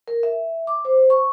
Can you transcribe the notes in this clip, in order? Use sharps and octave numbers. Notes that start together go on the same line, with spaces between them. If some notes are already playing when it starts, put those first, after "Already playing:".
A#4
E5
D6
C5
C#6